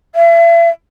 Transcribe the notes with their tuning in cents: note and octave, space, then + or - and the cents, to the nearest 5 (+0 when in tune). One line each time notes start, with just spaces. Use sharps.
E5 +40